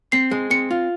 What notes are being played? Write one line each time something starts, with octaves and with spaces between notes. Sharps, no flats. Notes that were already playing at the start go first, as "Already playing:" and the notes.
C4 C7
G#3
C4 C#7
F4